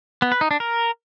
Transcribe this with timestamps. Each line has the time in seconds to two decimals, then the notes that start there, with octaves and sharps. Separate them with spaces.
0.22 B3
0.32 B4
0.41 D#4
0.51 D4
0.60 A#4